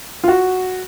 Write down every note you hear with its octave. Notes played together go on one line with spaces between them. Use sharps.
F4
F#4